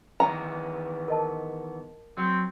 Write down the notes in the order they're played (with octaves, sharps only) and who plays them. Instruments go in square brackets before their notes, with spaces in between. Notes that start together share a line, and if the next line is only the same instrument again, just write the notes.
[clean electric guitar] D#3 E3 B3 [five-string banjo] A#5
[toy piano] A#4 D#5 A5
[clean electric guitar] F#3 [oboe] C4